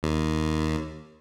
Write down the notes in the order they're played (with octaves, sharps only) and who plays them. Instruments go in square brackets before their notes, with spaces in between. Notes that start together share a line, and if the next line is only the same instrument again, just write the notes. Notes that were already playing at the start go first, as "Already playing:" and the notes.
[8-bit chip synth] D#2